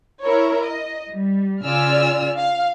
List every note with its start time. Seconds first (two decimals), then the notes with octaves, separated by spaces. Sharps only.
0.22 E4 A#4 C#5
0.65 D#5
1.12 G3
1.62 C#3 F4 D5 G#5 E6 F6
2.39 F5